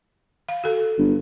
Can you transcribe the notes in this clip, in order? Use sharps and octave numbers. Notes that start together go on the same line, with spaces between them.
F5
F#4 A4
G1